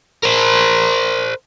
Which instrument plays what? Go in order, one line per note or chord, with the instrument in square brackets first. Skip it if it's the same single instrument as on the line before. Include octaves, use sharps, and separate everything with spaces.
[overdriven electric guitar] A#4 C5